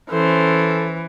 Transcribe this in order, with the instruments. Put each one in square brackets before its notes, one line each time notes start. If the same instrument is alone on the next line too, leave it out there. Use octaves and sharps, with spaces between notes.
[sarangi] E3 [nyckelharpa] C#4 C5 [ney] A4